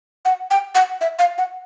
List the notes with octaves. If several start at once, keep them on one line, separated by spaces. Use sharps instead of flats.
F#5
G5
F#5
E5
F5
F#5